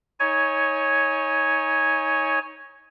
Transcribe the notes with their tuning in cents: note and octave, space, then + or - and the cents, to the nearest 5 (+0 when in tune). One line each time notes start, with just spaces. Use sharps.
D#4 +30 C#5 +0 G#5 +0